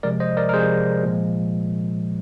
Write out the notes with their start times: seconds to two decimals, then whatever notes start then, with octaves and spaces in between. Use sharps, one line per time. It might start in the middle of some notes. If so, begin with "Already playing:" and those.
0.03 C3 F3 G#3 A#4 D5
0.20 C5 D#5
0.37 A#4 D5
0.49 A#4
0.53 C3 F3 G#3 G#4 C5
1.03 A#2 F3 G#3